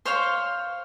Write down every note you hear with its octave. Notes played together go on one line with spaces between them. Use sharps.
C5 C#5 F5 C6